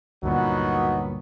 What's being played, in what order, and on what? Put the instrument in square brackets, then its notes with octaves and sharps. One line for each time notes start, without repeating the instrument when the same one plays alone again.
[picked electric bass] D2 G2 A#2 [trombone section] D#3 F#3 B3